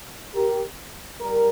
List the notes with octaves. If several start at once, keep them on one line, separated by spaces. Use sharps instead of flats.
G4 A#4
G3 A#4